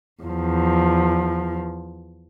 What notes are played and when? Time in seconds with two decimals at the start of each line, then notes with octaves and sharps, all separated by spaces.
0.23 E2 F3